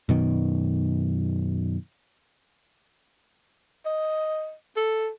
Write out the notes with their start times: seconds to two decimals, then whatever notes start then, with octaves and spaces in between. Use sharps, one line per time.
0.09 F#2 B2 D#3
3.86 D#5
4.76 A4